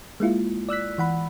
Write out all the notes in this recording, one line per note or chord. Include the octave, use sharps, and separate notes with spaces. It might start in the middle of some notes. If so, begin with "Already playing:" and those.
G#3 A#3 E4 F4
D5 E6 F#6 B6
E3 F#5 B5